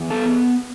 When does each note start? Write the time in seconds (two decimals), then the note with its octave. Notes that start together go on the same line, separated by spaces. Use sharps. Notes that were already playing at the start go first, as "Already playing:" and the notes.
Already playing: E2
0.10 B3 A4